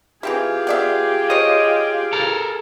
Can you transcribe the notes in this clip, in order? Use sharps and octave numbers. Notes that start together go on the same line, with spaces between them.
E3 C4 E4 F4 G4 G#4
B3 D5 E5
C5 C#5 D#5
A4 A#4